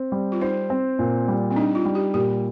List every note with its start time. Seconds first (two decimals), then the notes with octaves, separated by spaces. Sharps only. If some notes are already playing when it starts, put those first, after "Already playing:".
Already playing: C4
0.12 G3
0.32 F4
0.41 D#4 C5
0.70 C4
0.99 A#2
1.28 G3
1.51 C4
1.56 D4 D#4
1.75 F4
1.86 G3
1.95 G4
2.14 A#2 G4